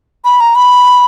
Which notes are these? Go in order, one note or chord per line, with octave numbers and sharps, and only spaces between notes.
B5
A#5
B5